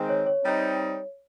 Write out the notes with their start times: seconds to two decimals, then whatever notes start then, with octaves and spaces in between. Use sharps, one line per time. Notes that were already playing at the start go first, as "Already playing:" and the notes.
Already playing: D#3 G#3 C4
0.09 C#5
0.26 C#5
0.44 G3 C4 D#4